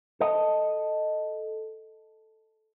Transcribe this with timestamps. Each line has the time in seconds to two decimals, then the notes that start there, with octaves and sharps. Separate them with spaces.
0.20 A4 D#5